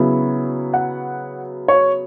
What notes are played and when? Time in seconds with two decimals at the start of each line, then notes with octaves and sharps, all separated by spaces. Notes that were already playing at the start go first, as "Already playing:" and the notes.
Already playing: C#3 F#3 B3 E4
0.74 F#5
1.68 C#5